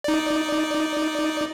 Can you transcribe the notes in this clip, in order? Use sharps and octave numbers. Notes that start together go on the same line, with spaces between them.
D#4 D5